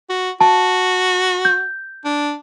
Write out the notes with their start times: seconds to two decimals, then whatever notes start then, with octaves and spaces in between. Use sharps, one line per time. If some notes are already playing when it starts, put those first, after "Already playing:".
0.10 F#4
0.41 F#4 A5
1.45 G6
2.05 D4